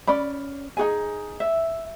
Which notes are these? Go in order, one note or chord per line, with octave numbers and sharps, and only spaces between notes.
C#4 D5 B5
D#4 F#4 G#4 G#5
E5